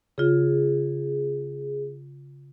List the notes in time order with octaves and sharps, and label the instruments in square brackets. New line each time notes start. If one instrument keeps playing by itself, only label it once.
[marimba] C#3 F4 [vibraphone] G#4